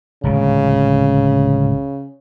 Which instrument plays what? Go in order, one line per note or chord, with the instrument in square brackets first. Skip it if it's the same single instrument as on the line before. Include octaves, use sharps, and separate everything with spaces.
[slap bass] D1 C#2 A#2 [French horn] C#3